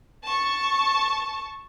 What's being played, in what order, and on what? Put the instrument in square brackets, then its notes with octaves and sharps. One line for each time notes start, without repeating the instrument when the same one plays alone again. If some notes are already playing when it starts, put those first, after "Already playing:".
[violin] A5 C#6